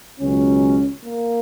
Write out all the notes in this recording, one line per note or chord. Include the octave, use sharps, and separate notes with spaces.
C#2 B2 F#3 C#4
A#3